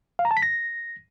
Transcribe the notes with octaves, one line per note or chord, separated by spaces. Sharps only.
F5
A#5
A5
B6
A#6